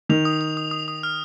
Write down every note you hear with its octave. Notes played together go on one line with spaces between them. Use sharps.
D#3 F7
D#6
D#6
D#6
D#6
D#6
F6